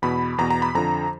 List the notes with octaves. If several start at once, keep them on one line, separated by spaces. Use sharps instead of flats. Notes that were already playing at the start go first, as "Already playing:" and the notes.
E2 B2 B5
E2 B2 A#5
A#5
B5
F2 D3 F3 A#5